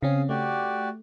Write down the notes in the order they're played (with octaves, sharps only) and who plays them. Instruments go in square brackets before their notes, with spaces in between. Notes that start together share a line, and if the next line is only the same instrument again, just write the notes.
[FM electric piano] C#3 C4 C#4 [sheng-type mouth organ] G#4 F5
[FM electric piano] A3 [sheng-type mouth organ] F#4 G4 D5